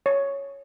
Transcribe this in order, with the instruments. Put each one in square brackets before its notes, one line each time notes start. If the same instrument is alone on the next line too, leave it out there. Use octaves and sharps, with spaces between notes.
[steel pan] C#5